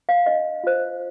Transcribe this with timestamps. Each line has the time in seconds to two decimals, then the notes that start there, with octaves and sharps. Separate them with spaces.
0.09 F5
0.26 D4 D#5
0.64 F4 C5